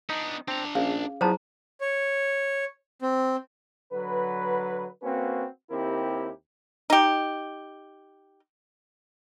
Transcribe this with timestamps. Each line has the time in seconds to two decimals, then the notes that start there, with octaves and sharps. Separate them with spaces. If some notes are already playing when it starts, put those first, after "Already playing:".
0.10 B3 D4 D#4
0.48 C4 D4 A#5
0.75 A#1 C#4 G#4 F5
1.21 F3 F#3 B3 E4 G#4 C5 A5 A#5
1.81 C#5
3.02 C4
3.92 D3 F#3 B4
5.02 A#3 C4 C#4 F#4 B4
5.70 D#2 C4 E4 G4 A#4
6.90 D#4 G4